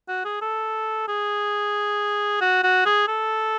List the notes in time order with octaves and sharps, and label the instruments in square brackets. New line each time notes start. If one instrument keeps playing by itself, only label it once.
[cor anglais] F#4
G#4
A4
G#4
F#4
F#4
G#4
A4